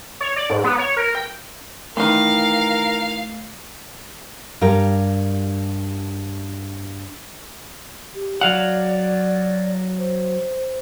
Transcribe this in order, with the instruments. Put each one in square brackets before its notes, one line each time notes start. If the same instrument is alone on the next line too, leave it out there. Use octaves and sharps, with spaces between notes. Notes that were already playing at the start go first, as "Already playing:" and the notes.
[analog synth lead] C#5
D5
G#2
B3
C#5
A#4
G5
[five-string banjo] D#3 E3 [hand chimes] A3 [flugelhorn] A#4 [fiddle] F5
[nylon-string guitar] G2 G4 A#4 F5
[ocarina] G4
[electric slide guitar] F#3 F5 F#5 [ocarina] D5
[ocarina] C5